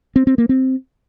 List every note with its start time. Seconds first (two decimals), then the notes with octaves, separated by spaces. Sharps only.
0.16 C4
0.27 C4
0.38 A#3
0.49 C4